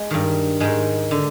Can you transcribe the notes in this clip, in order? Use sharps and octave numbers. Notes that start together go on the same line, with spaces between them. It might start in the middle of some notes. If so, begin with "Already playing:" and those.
Already playing: G#3
G2 D#3
G#2 D#3 G#3
D3